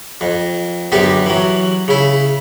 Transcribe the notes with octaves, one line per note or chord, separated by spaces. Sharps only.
F2
F#2 D3 B3 G4
E3 F#3
C#3 E4